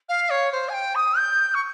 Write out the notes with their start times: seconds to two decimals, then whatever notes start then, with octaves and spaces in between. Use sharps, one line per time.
0.09 F5
0.30 C#5
0.52 C5
0.69 G#5
0.73 G5
0.95 D#6
1.17 G6
1.54 C#6